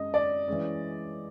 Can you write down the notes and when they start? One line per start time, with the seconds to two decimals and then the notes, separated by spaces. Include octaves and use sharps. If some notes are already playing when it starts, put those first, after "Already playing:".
Already playing: F#2 G#3 D#5
0.14 D5
0.48 E3 G#3 C#4